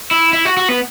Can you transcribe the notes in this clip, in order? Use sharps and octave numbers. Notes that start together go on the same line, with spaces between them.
E4
E4
F#4
F#4
B3